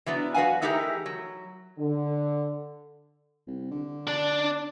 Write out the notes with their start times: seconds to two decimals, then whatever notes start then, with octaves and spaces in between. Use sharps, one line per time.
0.06 E3 F#3 B3 D4
0.34 F#4 B4 C5 F5 F#5 G#5
0.62 E3 A3 D#4 G4 G#4 A#4
1.06 F#3
1.79 D3
3.47 C2
3.71 D3
4.07 D4 D5